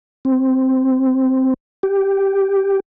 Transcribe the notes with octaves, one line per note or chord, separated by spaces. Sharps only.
C4
G4